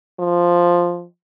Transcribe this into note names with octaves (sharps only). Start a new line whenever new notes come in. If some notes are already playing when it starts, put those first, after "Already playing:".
F3